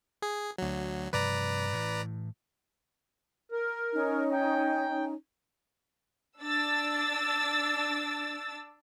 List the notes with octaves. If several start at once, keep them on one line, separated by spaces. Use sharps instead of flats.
G#4
D2 F#3
G2 C3 F3 B4 D5 A#5
A2 E3
A#4
C#4 D#4
G5
D4 E6 A6